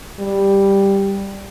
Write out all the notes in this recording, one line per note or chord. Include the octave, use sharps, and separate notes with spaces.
G3